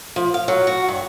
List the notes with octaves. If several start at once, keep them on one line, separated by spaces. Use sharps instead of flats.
F3
F5
F#3
F#4
G2